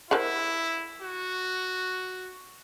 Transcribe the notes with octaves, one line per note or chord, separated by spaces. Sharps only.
E4 A#4 C5 F#5
F#4